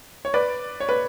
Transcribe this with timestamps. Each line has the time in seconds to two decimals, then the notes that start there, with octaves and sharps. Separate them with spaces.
0.25 C#5
0.34 B4 D5
0.80 C#5
0.89 B4